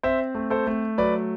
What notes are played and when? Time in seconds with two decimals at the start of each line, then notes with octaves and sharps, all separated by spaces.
0.03 C4 C5 E5
0.35 A3
0.50 A4 C5
0.67 A3
0.98 F#3 B4 D5